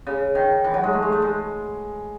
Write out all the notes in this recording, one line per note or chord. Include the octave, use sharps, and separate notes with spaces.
C#3
D#3
E3
F#3
G#3
A3
G#3
A3
G#3